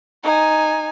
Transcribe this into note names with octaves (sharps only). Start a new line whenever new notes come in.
D#4 G#5